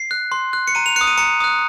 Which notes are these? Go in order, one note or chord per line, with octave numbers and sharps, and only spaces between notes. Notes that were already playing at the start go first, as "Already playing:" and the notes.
Already playing: C7
F#6
C6
F#6
C#7
A#5 D#7
F7
D#6 F#6 C#7
D#7
A#5 C#7
D#6 F#6